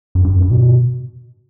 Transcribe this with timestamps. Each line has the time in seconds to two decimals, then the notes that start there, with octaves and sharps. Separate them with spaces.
0.15 F#2
0.24 G2
0.33 F#2
0.42 G2
0.51 B2